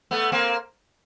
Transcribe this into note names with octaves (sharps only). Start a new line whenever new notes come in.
A3 B3
A#3 C4